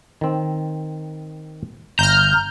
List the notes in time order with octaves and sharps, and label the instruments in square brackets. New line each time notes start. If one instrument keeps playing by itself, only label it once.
[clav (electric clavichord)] D#3 C4
[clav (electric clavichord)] G1 [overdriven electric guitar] A#5 [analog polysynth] F6 G6